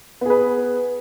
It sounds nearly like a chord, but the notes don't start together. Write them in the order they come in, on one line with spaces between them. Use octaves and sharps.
B3 G#4 B4